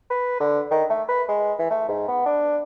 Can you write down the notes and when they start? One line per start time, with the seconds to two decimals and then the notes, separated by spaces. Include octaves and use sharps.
0.10 B4
0.40 D3
0.71 D#3
0.90 A3
1.08 B4
1.28 G#3
1.59 E3
1.70 A3
1.89 G#2
2.08 B3
2.26 D4